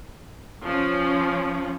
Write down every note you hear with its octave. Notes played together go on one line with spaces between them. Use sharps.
F3 C#4